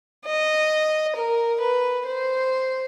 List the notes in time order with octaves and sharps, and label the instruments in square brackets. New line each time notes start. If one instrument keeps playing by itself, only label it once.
[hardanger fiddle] D#5
A#4
B4
C5